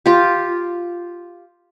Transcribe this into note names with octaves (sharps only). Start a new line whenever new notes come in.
F4 G4